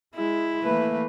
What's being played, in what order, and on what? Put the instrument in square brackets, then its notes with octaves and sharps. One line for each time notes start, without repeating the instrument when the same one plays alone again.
[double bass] G#3 [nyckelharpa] E4
[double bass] E3 A3 [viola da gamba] A#3 B4